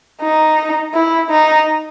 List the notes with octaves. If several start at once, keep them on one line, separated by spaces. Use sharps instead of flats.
D#4
E4
D#4